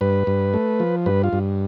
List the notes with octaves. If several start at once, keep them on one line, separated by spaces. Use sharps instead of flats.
G2 B4
G2
A3
F3
G2 B4
F4
G2